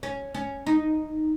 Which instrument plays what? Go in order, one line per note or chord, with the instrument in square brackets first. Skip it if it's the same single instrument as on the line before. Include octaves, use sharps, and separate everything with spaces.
[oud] C#4
C#4
D#4